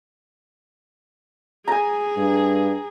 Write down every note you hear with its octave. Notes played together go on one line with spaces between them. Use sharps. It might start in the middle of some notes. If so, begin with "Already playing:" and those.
G#4 G#5 A#5
G2